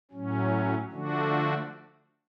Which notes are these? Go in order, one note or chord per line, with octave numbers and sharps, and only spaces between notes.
A2 F#3 C#4
D3 F3 A3 D4 F#4